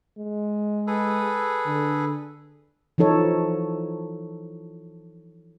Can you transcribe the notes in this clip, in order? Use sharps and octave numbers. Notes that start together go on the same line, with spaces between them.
G#3
G#4 A4 B4
D3
E3 F3 D#4 A4 C#5